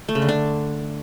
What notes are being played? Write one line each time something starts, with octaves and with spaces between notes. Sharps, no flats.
A3
C#3
D3
D4